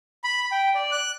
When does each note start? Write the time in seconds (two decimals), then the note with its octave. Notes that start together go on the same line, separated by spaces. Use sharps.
0.24 B5
0.52 G5
0.75 D5
0.92 F#6